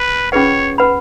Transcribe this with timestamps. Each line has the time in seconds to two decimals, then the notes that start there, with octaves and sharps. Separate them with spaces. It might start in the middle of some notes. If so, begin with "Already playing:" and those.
Already playing: B4
0.32 C#4 F4 G#4 B4 C#5 F#5
0.78 B4 F#5 B5